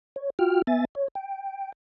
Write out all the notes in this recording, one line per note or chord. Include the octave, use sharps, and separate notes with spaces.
C#5
F4 F#4 G5 F6
B3 E5 G#5 A6
C#5
G5